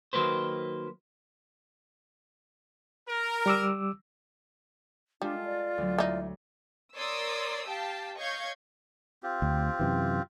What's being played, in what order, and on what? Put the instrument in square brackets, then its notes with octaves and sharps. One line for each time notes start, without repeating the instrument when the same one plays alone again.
[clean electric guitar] D#3 F3 F#3 A#3 B4 C5
[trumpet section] A#4
[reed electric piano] G3 D6 E6
[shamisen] G3 [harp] G#3 A4 [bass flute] D4 [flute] F4
[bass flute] D5
[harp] D2 F#3
[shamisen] E3 D#4
[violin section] A#4 C#5 D5 C6 D#6 E6
G4 F5 G5 A5
C#5 D#5 F5 C#6 G6 G#6
[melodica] C4 F4 G4
[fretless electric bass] D2
F#2 C3 E3